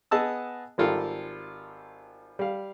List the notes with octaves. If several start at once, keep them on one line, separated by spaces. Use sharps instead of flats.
B3 G#4 D#5 A5 E6
G#1 G3 F4 A4 A#4
G3 F5